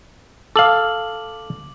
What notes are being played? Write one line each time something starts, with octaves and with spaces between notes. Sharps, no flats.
A4 F5 D6 F#7